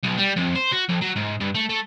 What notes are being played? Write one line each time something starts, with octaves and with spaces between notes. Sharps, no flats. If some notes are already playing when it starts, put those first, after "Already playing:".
B1
G3
F2
C5
F#4
F2
F#3
G#2
G2
A3
A3